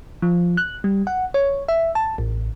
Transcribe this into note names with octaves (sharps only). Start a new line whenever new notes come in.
F3
F#6
G3
F#5
C#5
E5
A5
A1